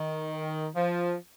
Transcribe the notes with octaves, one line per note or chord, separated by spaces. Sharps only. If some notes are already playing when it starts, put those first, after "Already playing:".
Already playing: D#3
F3